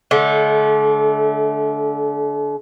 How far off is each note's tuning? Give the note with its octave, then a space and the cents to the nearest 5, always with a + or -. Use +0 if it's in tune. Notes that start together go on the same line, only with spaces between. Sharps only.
D3 -20 A3 -40